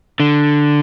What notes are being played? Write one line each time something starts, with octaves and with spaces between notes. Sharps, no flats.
D3